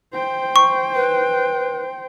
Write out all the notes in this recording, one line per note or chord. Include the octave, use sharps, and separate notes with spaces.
C5 G5
C#6
B4